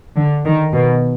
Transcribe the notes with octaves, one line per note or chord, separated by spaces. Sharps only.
D3
D#3
B2